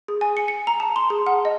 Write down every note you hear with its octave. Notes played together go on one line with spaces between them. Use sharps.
G#4
G#5
C#7
C#7
A#5
A5
C6
G#4
F#5
D#5